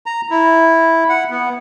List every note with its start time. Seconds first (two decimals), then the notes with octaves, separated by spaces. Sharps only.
0.06 A#5
0.30 E4
1.09 F#5
1.30 B3